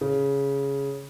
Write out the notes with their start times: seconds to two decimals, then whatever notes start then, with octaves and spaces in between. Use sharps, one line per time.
0.01 C#3